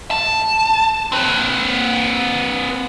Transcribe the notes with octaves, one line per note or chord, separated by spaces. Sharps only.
A5
C4 B4